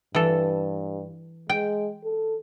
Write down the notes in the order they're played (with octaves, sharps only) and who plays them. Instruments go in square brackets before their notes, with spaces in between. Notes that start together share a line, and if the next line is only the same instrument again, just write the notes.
[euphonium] G2 [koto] E3 A4
[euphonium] G#3 [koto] G5
[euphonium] A4